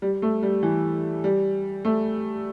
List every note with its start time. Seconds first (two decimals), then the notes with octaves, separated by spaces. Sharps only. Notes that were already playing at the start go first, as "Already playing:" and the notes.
0.02 G3
0.22 A3
0.43 G3
0.63 E3
1.24 G3
1.85 A3